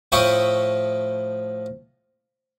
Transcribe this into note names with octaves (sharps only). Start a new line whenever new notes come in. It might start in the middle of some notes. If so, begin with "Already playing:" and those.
A2 F3 E4 G5 C#6 D#6